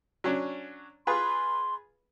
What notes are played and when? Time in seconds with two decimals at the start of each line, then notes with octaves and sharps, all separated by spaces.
0.24 F#3 C#4 D4
1.07 F4 G#4 B4 C6